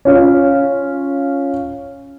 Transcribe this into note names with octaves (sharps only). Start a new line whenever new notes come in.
C#4 F4